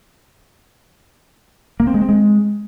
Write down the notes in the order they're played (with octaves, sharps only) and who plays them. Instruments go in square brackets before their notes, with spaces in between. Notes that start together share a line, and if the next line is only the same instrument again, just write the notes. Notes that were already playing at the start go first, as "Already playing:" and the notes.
[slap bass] A#3
C4
G#3
C4
G#3